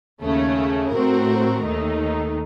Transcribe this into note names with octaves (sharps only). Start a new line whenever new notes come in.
D#2 C#3 A3 C#4
A2 A3 C4 F#4 A#4
D#2 D#3 A3 D#4